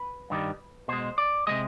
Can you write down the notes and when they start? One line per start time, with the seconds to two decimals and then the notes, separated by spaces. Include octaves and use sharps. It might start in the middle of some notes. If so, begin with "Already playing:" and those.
Already playing: B4
0.30 G2 D#3 G3
0.88 B2 G#3 C5
1.18 D5
1.47 C3 F3 G#3 D#5